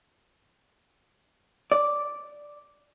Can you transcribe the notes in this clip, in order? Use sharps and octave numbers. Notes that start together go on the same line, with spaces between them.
D5